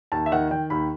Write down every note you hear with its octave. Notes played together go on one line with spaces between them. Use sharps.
D#2 A5
E5
D#3 F#5
D#3 G5
D#2 B5